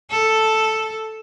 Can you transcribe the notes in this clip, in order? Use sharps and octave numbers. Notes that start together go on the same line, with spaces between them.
A4